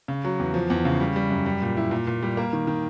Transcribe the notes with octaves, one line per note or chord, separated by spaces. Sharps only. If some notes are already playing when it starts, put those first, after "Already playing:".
C#3
F#3
E2
F3
E2
C#3
G3
G3
F#2
G3
A#2
E4
A#2
A#2
G3
A#3
D#3
D#3